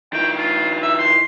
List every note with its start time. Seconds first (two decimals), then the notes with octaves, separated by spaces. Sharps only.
0.13 D#3 E4 G5
0.38 F4
0.82 E5
0.98 C6